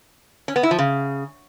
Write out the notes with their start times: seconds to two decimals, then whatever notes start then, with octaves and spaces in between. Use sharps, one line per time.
0.48 C#4
0.56 B3
0.63 E4
0.71 F3
0.79 C#3